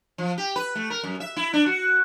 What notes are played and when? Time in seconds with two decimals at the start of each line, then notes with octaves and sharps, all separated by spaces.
0.18 F3
0.38 G4
0.56 B4
0.75 A3
0.90 A#4
1.03 F#2
1.20 E5
1.37 E4
1.54 D4
1.66 F#4